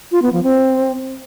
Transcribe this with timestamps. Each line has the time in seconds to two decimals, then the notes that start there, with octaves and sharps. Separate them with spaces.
0.12 F4
0.22 B3
0.33 F3
0.43 C4